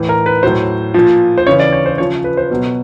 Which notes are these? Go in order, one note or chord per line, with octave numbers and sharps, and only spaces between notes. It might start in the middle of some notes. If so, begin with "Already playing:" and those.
Already playing: A2 E3
A#4
B4
A2 F#3 C5
A#2 F3
C5
C#3 E3 C#5
D5
C#5
C5
C#3 F3 C#5
B4
C5
B2 F#3